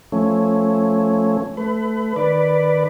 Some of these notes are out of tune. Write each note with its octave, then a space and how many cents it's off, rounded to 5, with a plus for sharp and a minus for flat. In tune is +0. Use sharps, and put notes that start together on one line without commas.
F3 +0 A3 +0 C#4 +0
A3 +0 B4 +30
D#3 -10 B4 +0 D5 +0